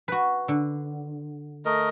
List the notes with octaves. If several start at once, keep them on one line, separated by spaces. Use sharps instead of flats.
F#4 B4
D3
A3 A#4 D#5